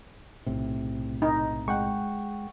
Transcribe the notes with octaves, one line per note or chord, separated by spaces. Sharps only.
B1 A2 C3
D#4
G#3 F#5 G5 C#6